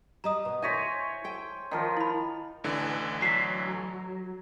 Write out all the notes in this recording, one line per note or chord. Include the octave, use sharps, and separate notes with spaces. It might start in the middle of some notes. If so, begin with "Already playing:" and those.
G3 D#5 A#5 D#6
B2 B3
E4 C5 C#5 E5 G#5 A#6 B6
A4 G5
D#3 F3 F4
E4 B5
A1 D3 E3
F#3 B6 C7